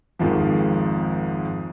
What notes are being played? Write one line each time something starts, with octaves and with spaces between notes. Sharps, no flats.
G#1 F2 G#2 D#3 F3